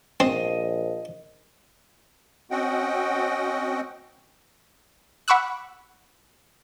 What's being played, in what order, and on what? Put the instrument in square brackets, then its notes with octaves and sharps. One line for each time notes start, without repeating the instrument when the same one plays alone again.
[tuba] A#1 [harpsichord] C4 [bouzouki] D#5
[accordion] C4 C#4 F#4 D#5 F#5 G5
[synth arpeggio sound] F#5 B5 C#6 D6 E6 F#6